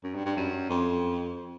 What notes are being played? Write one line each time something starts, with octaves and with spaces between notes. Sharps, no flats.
F#2
G2
G2
F#2
F2